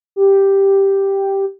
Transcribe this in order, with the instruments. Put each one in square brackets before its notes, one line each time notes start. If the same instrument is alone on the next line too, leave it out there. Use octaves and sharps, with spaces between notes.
[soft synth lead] G4